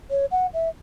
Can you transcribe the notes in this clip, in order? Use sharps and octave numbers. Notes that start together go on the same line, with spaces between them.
C#5
F#5
E5